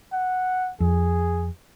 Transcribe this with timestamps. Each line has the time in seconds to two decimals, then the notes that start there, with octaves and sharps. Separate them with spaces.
0.13 F#5
0.80 F2 G#4